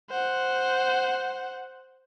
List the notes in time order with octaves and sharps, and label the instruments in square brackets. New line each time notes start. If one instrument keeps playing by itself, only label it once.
[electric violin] C5 F#5